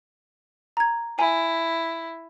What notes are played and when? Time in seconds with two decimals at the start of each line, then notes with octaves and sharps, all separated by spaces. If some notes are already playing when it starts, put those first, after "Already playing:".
0.77 A#5 G#6
1.19 E4 G#5